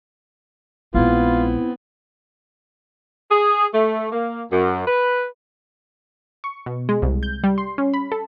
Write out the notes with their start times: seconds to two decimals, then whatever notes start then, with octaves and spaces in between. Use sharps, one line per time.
0.94 A#1 G#3 B3 C4 E4 F4
3.31 G#4
3.73 A3
4.12 A#3
4.52 F#2
4.88 B4
6.44 C#6
6.66 B2
6.89 G#3
7.02 C2
7.23 G6
7.44 G3
7.58 C6
7.78 C#4
7.94 B5
8.12 A4